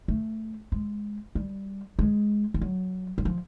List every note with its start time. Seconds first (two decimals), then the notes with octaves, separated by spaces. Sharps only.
0.08 A3
0.72 G#3
1.35 G3
1.99 G#3
2.54 G3
2.61 F#3
3.18 F#3
3.25 F3